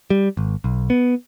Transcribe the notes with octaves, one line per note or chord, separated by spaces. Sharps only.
G3
G#1
B1
B3